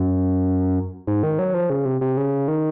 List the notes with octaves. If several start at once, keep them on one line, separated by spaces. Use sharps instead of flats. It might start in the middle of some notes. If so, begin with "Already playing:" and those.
Already playing: F#2
G#2
D#3
F#3
F3
C#3
C3
C3
C#3
D#3